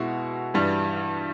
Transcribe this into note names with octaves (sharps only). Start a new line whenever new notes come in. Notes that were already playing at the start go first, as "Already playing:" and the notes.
Already playing: B2 G#3 E4 F#4
G2 E3 G3